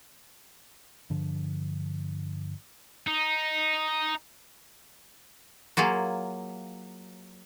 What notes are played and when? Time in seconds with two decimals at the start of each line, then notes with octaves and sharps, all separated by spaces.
1.10 G2 D3 F3
3.07 D#4
5.77 F#3 A#3 F4 G#4